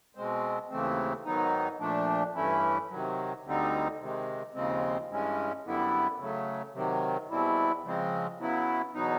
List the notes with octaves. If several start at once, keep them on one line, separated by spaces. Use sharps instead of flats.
B2 G#3 C4
D#2 C#3 E3 A3 C4
G#2 D#3 F#3 B3 D#4
A#2 F3 A3 D4
G2 E3 A3 C#4 E4
C3 D#3 F#3
D2 D3 G3 C4 D#4
C3 D#3 G#3
D#2 C#3 F3 G#3 C4
G2 E3 G#3 C#4
F#2 D3 G3 B3 E4
C#3 F#3 A3
C3 D#3 F#3
E2 B2 G3 C4 E4
C#3 F3 G#3 C4
C#3 F#3 B3 E4
E2 B2 F#3 B3 D#4